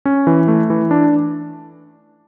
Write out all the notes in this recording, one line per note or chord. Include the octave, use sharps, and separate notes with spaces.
C#4
E3
A3
E3
D4